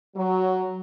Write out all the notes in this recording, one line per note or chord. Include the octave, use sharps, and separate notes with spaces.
F#3